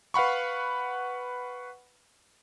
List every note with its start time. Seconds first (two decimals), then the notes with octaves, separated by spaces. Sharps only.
0.14 B4 F5 F#5 B5 C#6